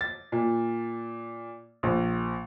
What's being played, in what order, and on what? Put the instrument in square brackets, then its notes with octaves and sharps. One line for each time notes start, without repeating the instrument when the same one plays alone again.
[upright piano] A6
A#2
A#1